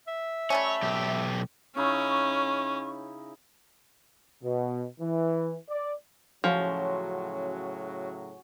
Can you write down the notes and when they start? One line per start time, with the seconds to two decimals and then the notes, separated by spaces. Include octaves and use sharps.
0.07 E5
0.50 G3 A3 C#4 C#5
0.83 B1 G4
1.77 C#3 C#4 D#4 E4 C#6
4.43 B2
5.00 E3
5.69 D5
6.44 A2 C#3 F3 F#3 C#4 F#4 C6